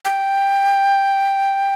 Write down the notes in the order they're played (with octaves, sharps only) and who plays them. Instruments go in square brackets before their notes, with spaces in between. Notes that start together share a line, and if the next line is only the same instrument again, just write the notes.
[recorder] G5